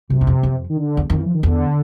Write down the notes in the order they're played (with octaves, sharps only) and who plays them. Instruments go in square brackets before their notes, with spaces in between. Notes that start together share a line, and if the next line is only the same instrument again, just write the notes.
[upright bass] F#2 [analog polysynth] C3
[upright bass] F#2
F2
F2
[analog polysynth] D#3
D3
[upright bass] E2
[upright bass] F2 [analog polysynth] D#3
[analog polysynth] E3
F3
D#3
[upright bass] E2 [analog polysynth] D3